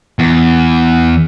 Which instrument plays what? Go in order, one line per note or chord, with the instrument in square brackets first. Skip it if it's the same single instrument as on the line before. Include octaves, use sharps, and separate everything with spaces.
[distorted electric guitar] E2